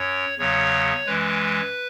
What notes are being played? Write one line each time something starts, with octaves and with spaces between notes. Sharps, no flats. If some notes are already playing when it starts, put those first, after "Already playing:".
Already playing: F#2 C#5
E2 C#3 F#3 C#5
F#2 E3 G#3 B4